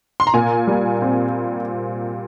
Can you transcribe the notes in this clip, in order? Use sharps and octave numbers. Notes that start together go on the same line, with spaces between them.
C6
A#5
A#2 G#5
G3
C4